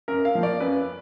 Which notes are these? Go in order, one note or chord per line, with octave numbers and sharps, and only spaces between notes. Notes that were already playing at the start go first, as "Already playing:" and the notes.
F#2 A#4
F5
F3 A#3
D5
F#2 B4